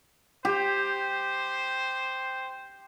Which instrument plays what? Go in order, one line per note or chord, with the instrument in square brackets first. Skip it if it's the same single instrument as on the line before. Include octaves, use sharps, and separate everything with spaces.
[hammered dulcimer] G4 [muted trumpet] C5